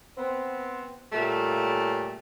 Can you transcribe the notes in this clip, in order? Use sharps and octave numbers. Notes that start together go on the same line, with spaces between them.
B3 C4
A#2 C#3 G3 A3